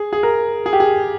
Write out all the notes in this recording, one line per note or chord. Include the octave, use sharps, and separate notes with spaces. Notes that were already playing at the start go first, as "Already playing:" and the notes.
Already playing: G#4
G#4
A#4
G#4
G4
G#4